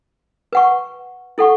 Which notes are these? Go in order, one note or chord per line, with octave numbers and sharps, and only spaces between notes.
B4 F#5 C#6
E4 A4 F#5 C#6